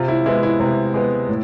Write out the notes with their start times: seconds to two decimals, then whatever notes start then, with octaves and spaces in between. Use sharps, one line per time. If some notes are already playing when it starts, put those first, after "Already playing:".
Already playing: C3 F4
0.08 E4
0.26 G#3 B3 E4
0.43 E4
0.60 C3
0.94 G#3 B3
1.29 A2